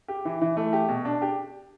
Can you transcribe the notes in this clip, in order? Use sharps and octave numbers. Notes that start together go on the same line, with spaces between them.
G4
E3
E3
A3
G4
B2
D4
G4